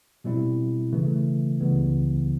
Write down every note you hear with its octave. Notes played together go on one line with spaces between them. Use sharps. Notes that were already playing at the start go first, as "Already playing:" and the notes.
B2 G3 C4 E4
C#3 E3 A3
C#2 C#3 E3 G3 B3